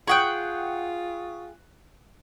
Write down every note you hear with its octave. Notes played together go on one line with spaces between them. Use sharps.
F4 G#4 F#5 G5 C#6 D#6 F#6